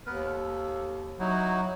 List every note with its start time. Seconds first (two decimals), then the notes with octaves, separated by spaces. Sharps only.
0.06 D#2 B3 A#4 B4
0.26 A4
1.19 F#3 D#4 E4 F#4